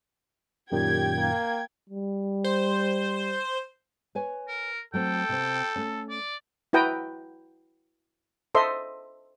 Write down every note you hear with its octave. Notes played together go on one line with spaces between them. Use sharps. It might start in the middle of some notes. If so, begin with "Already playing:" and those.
F#2 A#2 D#3 G4 G5 G#6
A#3
G3
C5
B4 C#5 G#5
A#4
F#3 A3 C4 A4 G5
C3 C4
A3 C#4
D5
E4 F#4 B4 G5 A#5 D#6
A4 C5 D#5 E5 C6